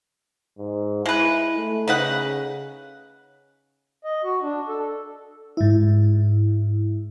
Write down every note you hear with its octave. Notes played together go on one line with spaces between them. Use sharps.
G#2
G#3 E4 B4
A3
C#3 D#4 B4 F#5
D#5
F#4
D4
A4
G#2 E4